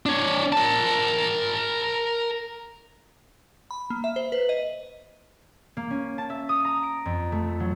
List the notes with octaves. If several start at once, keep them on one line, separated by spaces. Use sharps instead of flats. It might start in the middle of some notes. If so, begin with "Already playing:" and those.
D4 C#5
A#4 A5
B5
A#3
E5
C5
B4
D#5
A#3
C#4
A5
E5
D#6
A#5
D7
F2
A3
F#3